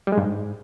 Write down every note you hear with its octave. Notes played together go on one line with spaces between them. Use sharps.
G3
G#3
G2
G#2